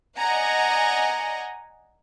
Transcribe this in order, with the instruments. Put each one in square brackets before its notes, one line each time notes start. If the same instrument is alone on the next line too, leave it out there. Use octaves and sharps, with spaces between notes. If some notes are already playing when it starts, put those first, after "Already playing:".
[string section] D5 D#5 F#5 G#5 A#5